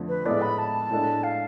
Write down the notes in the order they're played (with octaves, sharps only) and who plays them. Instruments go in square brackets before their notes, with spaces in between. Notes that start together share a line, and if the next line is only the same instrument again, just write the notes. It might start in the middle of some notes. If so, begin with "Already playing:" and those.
Already playing: [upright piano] F2 D3 F3 A3
[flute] B4
[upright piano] A2 G#3 B3 E4 A4 [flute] D5
[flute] B5
A5
[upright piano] A2 G#3 D4 A4
[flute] F5